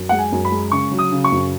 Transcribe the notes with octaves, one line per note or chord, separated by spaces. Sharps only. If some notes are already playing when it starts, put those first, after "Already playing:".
Already playing: F#2
G#3 F#5
G#5
F#2
B5
G#3
C#3 C#6
F#3
D#6
C#3
C#6
F#2